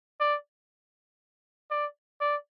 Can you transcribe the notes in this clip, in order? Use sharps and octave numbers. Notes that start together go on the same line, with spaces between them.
D5
D5
D5